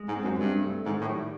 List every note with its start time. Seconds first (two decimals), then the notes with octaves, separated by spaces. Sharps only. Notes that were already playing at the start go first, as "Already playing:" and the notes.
Already playing: G#3
0.08 G#2
0.16 C4
0.24 F#2
0.38 G2 C3
0.63 A3
0.86 G#2 D#3
1.01 A2
1.09 G3